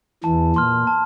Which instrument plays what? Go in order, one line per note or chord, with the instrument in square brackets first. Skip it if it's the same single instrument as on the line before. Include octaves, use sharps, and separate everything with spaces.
[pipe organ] E2 E3 [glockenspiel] A5
[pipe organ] A#2 [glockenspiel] C6 F6
[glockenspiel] A5